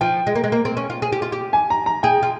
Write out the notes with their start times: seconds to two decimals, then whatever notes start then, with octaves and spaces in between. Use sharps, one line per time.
0.01 F3 G5
0.27 G#3
0.35 A#3
0.44 G#3
0.52 A#3
0.65 C4
0.77 C#4
0.90 F4
1.02 G#4
1.12 G4
1.22 F4
1.32 G4
1.53 G#5
1.70 A#5
1.86 A#5
2.03 G#4 G5
2.23 F4